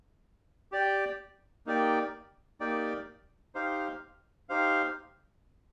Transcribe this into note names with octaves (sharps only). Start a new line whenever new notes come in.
G4 D5 G5
A#3 D#4 G4 D5 G5
A#3 D#4 G4 D5 G5
D#4 G4 C5 F5
D#4 G4 C5 F5